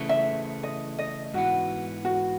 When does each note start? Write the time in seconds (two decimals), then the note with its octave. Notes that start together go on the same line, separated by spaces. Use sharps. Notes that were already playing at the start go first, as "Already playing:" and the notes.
Already playing: C#3 E3 A3
0.09 E5
0.63 D#5
0.98 D#5
1.34 G#2 E3 B3 F#4
2.05 F#4